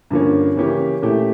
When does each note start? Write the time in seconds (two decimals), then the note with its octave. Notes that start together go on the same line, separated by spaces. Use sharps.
0.11 G2 D3 F3 A#3 C#4
0.56 C#3 E3 A#3 C#4 G4
1.02 A#2 A3 C#4 E4 G4